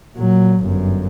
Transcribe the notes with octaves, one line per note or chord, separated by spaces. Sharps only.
A#2 F#3
G1 F#2